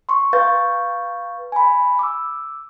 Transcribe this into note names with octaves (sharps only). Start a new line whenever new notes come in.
C6 C#6
B4 F5 C#6 G6 A6
G#5 B5
D6 E6